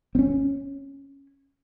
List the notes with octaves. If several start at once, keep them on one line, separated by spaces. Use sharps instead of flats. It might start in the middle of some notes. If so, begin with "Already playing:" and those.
C4 C#4